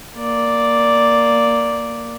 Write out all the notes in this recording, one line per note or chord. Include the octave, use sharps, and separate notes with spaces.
A#3 D5